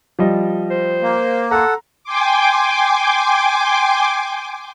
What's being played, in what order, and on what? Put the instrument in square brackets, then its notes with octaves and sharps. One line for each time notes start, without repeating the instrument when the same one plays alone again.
[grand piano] F3 G3 D#5
[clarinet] C5
[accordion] A#3
[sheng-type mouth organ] A4 F#5 [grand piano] A#5 C6
[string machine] G5 G#5 C6 D6